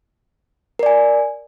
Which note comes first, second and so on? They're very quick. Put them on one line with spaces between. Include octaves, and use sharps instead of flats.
A#4 D5 G#5